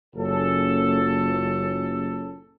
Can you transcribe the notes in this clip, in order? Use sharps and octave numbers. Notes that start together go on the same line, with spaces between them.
F#1 A#2 C#4 A4